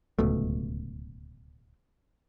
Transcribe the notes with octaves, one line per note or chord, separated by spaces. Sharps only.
D1 C#2 B2 A3